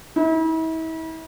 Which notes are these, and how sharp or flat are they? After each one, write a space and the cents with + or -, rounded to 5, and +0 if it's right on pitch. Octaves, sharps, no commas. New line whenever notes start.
E4 -40